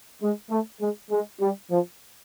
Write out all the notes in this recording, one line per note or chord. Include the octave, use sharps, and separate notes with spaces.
G#3
A3
G#3
G#3
G3
F3